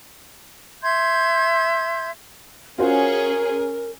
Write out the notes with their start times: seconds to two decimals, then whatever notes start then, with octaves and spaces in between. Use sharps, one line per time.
0.83 E5 C6 G6 G#6
2.78 C#4 F4 F#4 G#4 A#4 C5